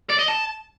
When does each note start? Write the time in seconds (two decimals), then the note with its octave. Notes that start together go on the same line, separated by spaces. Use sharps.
0.10 D5
0.19 D#5
0.28 A5